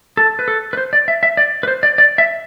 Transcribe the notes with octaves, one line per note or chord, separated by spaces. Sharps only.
A4
B4
A4
B4
C5
D5
E5
E5
D5
B4
C5
D5
D5
E5